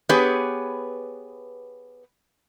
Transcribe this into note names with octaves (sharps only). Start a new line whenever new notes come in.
B3 G4 G#4 B4 C#5